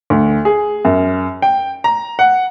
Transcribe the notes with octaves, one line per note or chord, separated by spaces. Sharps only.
D2
G#4
F#2
G5
A#5
F#5